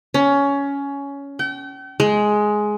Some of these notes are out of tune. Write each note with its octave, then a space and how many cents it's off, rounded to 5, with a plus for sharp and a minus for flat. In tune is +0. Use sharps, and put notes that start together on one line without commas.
C#4 +15
G5 -40
G#3 +10